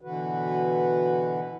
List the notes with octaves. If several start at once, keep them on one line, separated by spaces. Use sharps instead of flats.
B2 D3 E3 F#4 B4